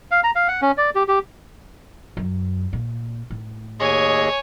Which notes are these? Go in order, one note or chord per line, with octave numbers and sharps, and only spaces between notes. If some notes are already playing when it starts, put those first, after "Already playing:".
F5
A#5
F5
F#5
C#4
D5
G4
G4
F#2
A#2
A2
D#2 G#4 C#5 D#5 G#5